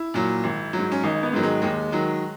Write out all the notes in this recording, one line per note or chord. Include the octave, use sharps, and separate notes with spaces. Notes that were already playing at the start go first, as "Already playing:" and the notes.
Already playing: E4
A#2 F#3
G#1
F#3
G#2
C#4
G#1 D#4
B3
G#2 D#3 F#3
G#3
D#2 G#3
D#3 F#3